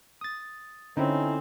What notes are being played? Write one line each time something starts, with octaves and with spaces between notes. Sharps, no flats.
D#6 A6
D3 C4 C#4 D#4 E4